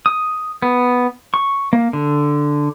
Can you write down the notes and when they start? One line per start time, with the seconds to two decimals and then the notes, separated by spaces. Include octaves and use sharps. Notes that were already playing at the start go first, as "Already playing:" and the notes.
0.06 D#6
0.62 B3
1.34 C#6
1.73 A#3
1.93 D3